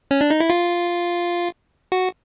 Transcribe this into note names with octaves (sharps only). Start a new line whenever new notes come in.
C#4
D4
D#4
E4
F4
F#4